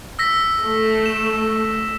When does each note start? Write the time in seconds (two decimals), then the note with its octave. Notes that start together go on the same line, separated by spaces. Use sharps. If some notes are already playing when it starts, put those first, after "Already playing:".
0.19 E6 A#6 B6
0.63 A3
1.06 E7